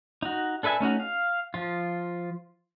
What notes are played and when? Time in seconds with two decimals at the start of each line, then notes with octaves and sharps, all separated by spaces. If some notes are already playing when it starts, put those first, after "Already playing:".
0.22 D#4 F#4
0.63 D4 A4 B4 E5 G#5
0.80 A3 C#4 D#4 F#4
1.00 F5
1.54 F3 F4